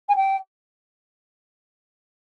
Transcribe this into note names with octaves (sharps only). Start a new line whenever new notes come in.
G#5
G5